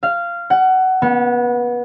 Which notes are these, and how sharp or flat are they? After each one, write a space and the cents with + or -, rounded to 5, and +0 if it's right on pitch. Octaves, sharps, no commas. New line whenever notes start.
F5 -15
F#5 +20
B3 -25